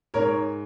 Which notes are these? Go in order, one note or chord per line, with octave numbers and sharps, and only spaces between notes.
G#2 A#4 C#5